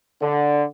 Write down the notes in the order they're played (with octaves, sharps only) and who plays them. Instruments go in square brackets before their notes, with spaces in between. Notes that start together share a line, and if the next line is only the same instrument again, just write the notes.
[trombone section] D3